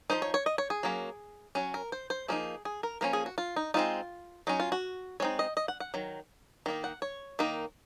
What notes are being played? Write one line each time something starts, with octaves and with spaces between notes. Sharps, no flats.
F3 A#3 D#4 C5
C#5
C#5
D#5
C#5
G#4
F#3 A#3 C#4
F#3 C#4 F#4
A#4
C5
C5
F3 A#3 D#4 G#4
G#4
A#4
F3 A#3 C#4 A#4
G#4
F#4
F4
D#4
G#3 C4 D#4 F4
F#3 C#4 D#4
F4
F#4
G#3 C4 D#4 C#5
D#5
D#5
F#5
F#5
D#3 F#3
D#3 A#3 D#4
F#5
C#5
D#3 A#3 D#4